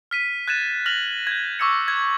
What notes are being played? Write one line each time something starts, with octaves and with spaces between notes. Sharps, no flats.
F6 B6 D#7
F#6 G#6 A6 D#7 E7
F6 A#6 F7 F#7
G6 G#6
C#6 D6 E6 G#6 C#7
F#6 G#6